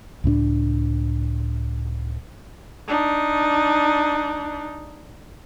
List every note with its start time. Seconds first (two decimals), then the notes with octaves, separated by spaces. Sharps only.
0.24 C#2 A2 C4 D4
2.88 D4 D#4